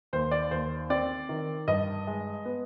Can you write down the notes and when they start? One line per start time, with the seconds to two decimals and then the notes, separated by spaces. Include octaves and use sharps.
0.13 D#2 C5
0.31 D5
0.51 D#2 C5
0.90 C4 D5
1.29 D#3
1.68 G2 D#5
2.07 G#3
2.45 B3